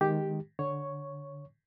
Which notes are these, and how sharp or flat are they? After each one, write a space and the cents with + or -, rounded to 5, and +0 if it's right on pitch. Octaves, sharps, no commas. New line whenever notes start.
D#3 +0 G#3 +0 G4 +0
D3 +0 C#5 +0 C#6 +0